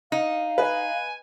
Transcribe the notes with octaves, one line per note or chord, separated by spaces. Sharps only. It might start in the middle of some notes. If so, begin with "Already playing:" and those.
D#4 F5
B4 D#5 G#5